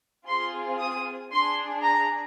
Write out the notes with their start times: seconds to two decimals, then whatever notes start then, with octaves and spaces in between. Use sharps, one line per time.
0.27 C4 F4 G#4 C6
0.80 D#6
1.31 D4 G#4 C6
1.83 A#5